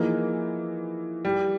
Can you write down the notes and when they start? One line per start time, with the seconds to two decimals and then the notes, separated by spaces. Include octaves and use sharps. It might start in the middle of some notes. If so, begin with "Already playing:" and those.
Already playing: E3 F3 A#3 D#4 G#4
1.25 G3